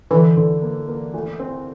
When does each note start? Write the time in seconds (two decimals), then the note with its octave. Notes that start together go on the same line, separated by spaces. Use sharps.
0.11 D3 E3
0.36 D3
0.62 A#3
0.88 A#3
1.14 D2
1.39 C4